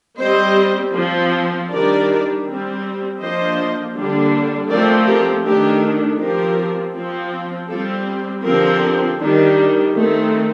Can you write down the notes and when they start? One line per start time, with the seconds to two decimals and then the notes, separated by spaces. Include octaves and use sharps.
0.20 G3 C4 C5 D#5
0.95 F3 C4
1.70 D#3 G3 D4 A#4 D5
2.46 G3 C4
3.20 F3 A#3 D4 C5 D#5
3.95 D3 G3 A#3 D4
4.69 F3 A3 C4 A#4 D5
5.07 G4 A#4
5.45 D#3 A3 D4 G4 A#4
6.19 F3 C4 G4 A#4
6.94 F3 C4
7.69 G3 C4 F4 A4
8.44 D3 F3 C4 G4 A#4
9.19 D#3 G3 D4
9.93 D#3 A3 C4